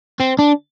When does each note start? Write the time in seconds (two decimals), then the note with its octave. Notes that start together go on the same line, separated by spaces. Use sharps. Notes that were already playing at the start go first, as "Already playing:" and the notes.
0.20 C4
0.39 D4